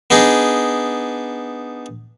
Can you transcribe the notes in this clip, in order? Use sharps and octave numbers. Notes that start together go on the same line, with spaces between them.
B3 D4 D#4 G#4